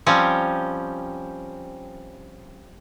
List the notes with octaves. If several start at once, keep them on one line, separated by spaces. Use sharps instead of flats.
F3 G3 C4 C#4